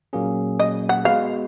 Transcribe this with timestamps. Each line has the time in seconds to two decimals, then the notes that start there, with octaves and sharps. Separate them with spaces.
0.13 A#2 F#3 A#3 C#4 G#4
0.59 D#5
0.89 F#5
1.05 G#3 B3 F#4 B4 F5